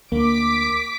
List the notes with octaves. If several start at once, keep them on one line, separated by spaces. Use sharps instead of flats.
D2 A#3 D6 B6